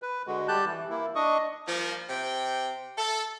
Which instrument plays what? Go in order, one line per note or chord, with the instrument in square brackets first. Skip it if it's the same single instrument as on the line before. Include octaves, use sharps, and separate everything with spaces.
[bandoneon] B4
D3 G#3 F#4
G3 G4 A5 F#6 G6
E3
A#3 E4
D4 D#5 C#6 D#6
[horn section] F3 G3 A#3
C3 G5
A4